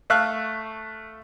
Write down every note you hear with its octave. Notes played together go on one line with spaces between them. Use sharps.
A3 E5 F5 C#6 F#6